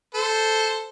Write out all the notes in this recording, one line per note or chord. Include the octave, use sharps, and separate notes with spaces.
A4 C5